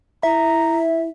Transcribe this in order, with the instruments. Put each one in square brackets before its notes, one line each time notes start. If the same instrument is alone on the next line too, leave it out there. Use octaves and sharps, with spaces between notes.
[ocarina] E4 [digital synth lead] E5 [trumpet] A#5